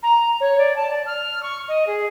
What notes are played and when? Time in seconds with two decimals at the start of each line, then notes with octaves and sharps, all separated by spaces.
0.02 A#5
0.40 C#5
0.58 D5
0.76 A5
0.90 D5
1.06 F6
1.42 C#6
1.68 D#5
1.86 G#4